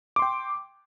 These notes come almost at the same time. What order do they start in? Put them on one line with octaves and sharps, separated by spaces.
D6 C6 G5